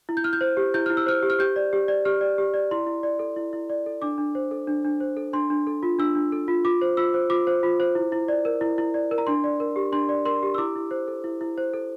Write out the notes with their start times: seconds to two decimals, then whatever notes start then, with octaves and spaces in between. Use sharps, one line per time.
0.09 E4
0.17 G6
0.24 E4 F6
0.33 G6
0.41 C5
0.57 G4
0.74 E4 G6
0.86 E4 F6
0.97 E6
1.06 C5 F6
1.22 G4
1.30 F6
1.39 G4 G6
1.56 D5
1.73 G4
1.88 D5
2.05 G4 F6
2.21 D5
2.38 G4
2.54 D5
2.71 E4 C6
2.87 E4
3.03 D5
3.19 A4
3.36 E4
3.53 E4
3.70 D5
3.86 A4
4.02 D4 D6
4.18 D4
4.35 C5
4.51 A4
4.67 D4
4.85 D4
5.00 C5
5.16 A4
5.33 D4 C6
5.50 D4
5.67 A4
5.83 F4
5.99 D4 E6
6.15 D4
6.32 A4
6.48 F4
6.65 F4 D6
6.81 C5
6.97 F4 E6
7.14 C5
7.30 F4 D6
7.47 C5
7.63 F4
7.80 C5
7.95 E4
8.12 E4
8.28 D5
8.45 A#4
8.61 E4
8.78 E4
8.94 D5
9.11 A#4
9.18 A#5
9.27 D4 C6
9.44 D5
9.60 A#4
9.76 G4
9.92 D4 C6
10.09 D5
10.25 A#4 C6
10.43 G4
10.54 E6
10.58 E4 D6
10.75 E4
10.91 C5
11.08 A4
11.24 E4
11.41 E4
11.58 C5
11.74 A4